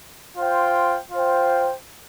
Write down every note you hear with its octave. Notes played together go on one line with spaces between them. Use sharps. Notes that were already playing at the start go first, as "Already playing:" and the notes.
F4 C5 G5
F4 C5 G5